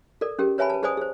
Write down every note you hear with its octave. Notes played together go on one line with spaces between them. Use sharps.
A4 A#4 D5
C#4 G4 G#4 A#4
B4 C#5 E5 G#5 A5 B5
B4 A5
G#4 B4 C5 D5 G#5 D#6
G#4 C5